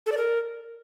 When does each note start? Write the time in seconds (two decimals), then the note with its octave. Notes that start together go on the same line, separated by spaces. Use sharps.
0.06 A4
0.12 D5
0.17 A#4